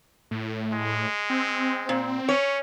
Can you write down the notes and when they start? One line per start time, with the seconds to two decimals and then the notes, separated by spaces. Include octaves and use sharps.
0.31 A2
0.73 G#3
1.30 C4
1.89 A#2
2.29 C#4 C#5